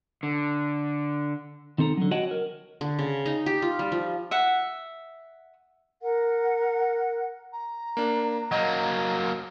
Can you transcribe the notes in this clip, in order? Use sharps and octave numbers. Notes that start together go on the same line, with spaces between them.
D3
D#3 C4 A4 A#5
D3 F#3
F#4 C#5 D#5 F#5 G5 A5
A#4
D3
C#3
D#4
G4
F4
G3
F3
E5 F#5
A#4 F#5
A#5
A#3 D4
F#3 A#3 D#5 G6